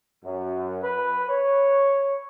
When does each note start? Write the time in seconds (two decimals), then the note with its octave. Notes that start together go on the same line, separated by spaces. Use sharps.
0.25 F#2
0.83 B4
1.30 C#5